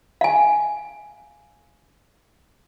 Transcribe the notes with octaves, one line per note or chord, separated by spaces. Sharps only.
F5 G#5